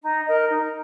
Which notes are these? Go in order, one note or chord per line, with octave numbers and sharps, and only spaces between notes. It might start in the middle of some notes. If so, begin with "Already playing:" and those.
D#4
A#4 D#5
D#4